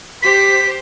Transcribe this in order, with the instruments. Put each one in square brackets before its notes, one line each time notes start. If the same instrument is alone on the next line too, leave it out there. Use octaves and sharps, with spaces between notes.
[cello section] G4 C5 [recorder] B6